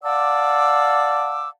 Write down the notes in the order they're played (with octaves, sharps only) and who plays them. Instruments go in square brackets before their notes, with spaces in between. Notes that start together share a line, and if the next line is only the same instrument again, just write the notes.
[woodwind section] D5 F5 F#5 A5 D6 E6